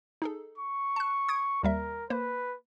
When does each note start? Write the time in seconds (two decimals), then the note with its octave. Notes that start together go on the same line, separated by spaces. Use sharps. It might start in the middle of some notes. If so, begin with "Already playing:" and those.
0.22 D#4 G#4 A4
0.58 C#6
0.96 A5 F#6
1.29 D#6 G#6 D7
1.63 D#2 G3 A#4 E5
2.10 A#3 B4 C5